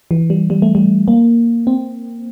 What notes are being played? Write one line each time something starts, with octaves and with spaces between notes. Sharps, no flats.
E3
G3
G3
A3
G3
A#3
C4